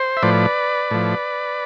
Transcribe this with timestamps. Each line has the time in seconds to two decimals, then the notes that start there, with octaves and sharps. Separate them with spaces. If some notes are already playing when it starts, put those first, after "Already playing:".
Already playing: C5
0.17 E5
0.22 A2 F3 B4 D5
0.91 A2 F3